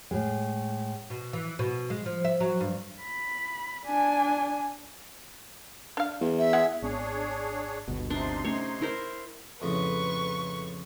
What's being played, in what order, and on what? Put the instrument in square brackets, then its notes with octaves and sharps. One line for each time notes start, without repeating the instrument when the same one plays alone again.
[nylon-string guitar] A2 G#3
[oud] B2
E3
B2
G#3
F3
E5
F#3
G2
[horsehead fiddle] B5
D4 G#5
[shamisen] D4 F5
[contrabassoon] E2
[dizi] E5
[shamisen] G#3 G#4 F#5
[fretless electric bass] G#1 B3 [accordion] D4 G#4 C#5
[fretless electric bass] G1 D2 B2
[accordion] C3 D#4 C6 [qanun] D4
[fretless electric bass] A3 C4 C#4 [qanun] C#5
[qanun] E4 A#4 C5
[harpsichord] F2 A2 C#3 [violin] B4 C#6